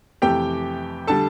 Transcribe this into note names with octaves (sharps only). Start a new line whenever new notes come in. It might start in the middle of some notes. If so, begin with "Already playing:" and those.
F2 C3 E3 A3 G4 G5
D3 G3 A4 A5